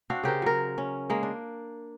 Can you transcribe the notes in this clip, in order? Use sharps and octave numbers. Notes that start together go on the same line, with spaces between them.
C4 D4 F#4 F5
C#3 G4 A#4 C5
F#3 A#4
C#4
G#3 A#3
D4